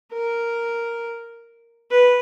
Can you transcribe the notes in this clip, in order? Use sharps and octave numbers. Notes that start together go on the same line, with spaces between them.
A#4
B4